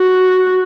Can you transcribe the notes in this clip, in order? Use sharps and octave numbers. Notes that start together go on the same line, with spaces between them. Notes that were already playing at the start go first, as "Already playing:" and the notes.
Already playing: F#4